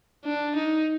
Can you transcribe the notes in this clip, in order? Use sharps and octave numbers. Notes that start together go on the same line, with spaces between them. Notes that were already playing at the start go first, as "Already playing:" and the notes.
D4
D#4